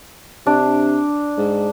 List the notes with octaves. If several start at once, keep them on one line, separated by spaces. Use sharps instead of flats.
C3 D4
G#2